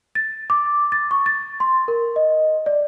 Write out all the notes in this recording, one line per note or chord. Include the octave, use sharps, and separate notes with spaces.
A6
D6
A6
C#6
A6
C6
A#4
D#5
D5